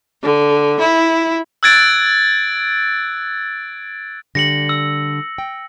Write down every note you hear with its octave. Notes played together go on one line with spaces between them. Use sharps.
D3
E4
E6 F#6 G#6 A6 D7
D3 G3 A#6 C#7 F#7
E6
G5